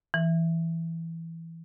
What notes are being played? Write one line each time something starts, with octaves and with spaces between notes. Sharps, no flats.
E3